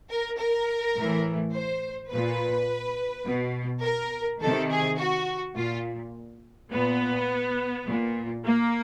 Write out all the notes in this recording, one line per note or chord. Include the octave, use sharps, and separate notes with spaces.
A#4
A#4
A2 E3
C5
A#2 B4
B2
A#4
C3 D#3 A4
G#4
F#4
A#2 F4
A#2 B3
A#2
A#3